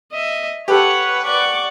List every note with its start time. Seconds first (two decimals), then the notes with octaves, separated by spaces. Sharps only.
0.12 D#5 E5
0.68 G4 A4 B4 C#5 F#5
1.24 D5 F#5 C#6 D6